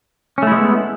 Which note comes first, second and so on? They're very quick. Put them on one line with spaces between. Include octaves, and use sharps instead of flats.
C#4 A3 E4 G#3 B3